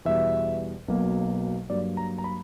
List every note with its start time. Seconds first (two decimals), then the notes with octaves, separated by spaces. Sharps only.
0.05 E2 B2 G3 E5
0.88 B1 B2 F#3 A#3
1.70 G2 F#3 A#3 D5
1.97 A#5
2.18 A#5
2.24 B5